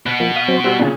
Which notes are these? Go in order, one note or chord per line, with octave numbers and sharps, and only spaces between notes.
B2 B3 F#5
F3 A#3
F5 D#6
F#3 C4 C5
G3 F#4 C5 E6 F#6
A#2 C#3 D4 F#5 A5